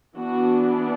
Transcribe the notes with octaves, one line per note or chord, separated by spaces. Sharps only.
E3 B3 D4 F#4